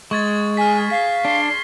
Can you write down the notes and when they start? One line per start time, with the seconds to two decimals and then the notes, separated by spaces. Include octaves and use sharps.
0.11 G#3 C#6 G#6 A6
0.57 G#4 G#5 F6 B6
0.90 F5 B6
1.25 D4 C6